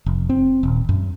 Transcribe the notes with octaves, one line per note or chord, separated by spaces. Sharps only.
F1
C4
D#1
F#2